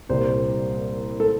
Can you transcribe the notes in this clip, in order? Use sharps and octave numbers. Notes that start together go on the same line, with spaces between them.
C2 A#2 G3 A#3 C5
A4